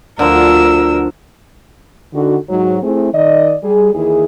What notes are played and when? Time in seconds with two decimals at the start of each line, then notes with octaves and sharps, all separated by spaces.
0.19 D2 D3 F3 A#4 E6
2.14 D3 D#3 F#4
2.49 G#2 F#3
2.83 A3 C4 E4 G#4
3.14 D#3 D5 D#5
3.63 G3 G#4
3.94 D#2 E3 E4 G#4